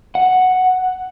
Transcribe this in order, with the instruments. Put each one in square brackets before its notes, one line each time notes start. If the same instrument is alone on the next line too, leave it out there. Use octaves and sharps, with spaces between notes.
[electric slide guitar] F#5